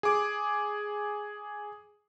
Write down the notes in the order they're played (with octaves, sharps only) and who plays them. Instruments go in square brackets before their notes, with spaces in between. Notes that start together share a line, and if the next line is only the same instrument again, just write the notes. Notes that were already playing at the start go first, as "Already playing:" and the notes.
[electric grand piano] G#4 D6